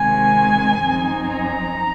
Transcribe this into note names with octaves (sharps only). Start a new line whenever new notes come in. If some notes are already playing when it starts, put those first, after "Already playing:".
Already playing: C3 D#3 G#3 G#5
F#2 F3 C4 D#4
A#5